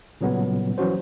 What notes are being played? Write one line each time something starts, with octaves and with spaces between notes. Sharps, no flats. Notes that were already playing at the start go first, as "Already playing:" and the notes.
A#2 C#3 F#3 G3 B3
E3 F#3 C#4 F#4 C5